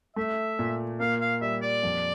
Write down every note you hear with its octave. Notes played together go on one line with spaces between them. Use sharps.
A3 E5
A#2
A#3 F5
F5
G3 E5
D5
F2